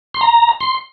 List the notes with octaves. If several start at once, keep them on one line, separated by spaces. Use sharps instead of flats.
C6
A#5
C6